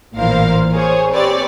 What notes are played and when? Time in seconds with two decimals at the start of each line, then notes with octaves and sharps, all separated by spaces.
0.16 A1 A#2 E3 A#4 C5 F5
0.73 G#4 C5 C#5
1.11 C4 G4 B4 C#5 D5